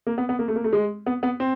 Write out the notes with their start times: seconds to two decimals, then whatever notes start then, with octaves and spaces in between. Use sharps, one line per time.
0.07 A#3
0.18 B3
0.29 B3
0.39 A#3
0.48 A3
0.56 A#3
0.64 A3
0.73 G#3
1.06 B3
1.23 B3
1.40 C4